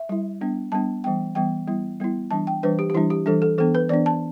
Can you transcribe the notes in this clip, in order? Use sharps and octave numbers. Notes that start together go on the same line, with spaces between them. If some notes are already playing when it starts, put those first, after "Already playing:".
Already playing: E5
G3 E4
G3 B3 D4
G3 B3 D4 A5
E3 G3 B3 G5
E3 G3 B3 G5
G3 B3 E4
G3 B3 E4
E3 G3 D4 A5
G5
E3 G3 D4 B4
G4
G4
E3 G3 D4 E4
G4
E3 G3 D4 A4
A4
E3 B3 D4 A4
B4
E3 B3 D4 D5
A5